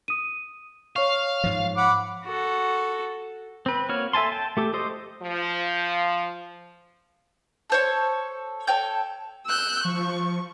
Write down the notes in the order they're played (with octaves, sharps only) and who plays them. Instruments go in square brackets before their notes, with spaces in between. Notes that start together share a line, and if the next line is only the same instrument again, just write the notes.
[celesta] D#6 D#7
[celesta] C#5 C#6 [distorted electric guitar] F5
[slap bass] G#2 F3
[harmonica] F#5 B5 D6
[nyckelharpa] F#4 A4
[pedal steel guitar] C4 B4
A#3 F#4 C#5 F6
A4 E5 G#5 A5 C6
G5 A5
A3 G4 A4
G4 A4 C5 D#5
[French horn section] F3
[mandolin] A4 C5 C#5
A4 C#5 G5 G6
[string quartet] E6 F#6 G6
[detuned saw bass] F3 [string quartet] C#6